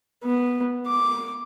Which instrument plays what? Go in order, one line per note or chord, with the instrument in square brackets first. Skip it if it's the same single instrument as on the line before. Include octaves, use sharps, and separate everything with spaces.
[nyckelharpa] B3
D6